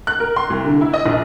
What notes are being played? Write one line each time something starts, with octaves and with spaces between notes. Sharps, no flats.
F#6
A#4
C6
C2
D3
E4
D#5
A#1